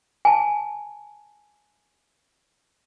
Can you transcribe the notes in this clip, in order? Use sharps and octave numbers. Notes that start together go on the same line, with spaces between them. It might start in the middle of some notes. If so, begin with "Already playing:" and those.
G#5 A5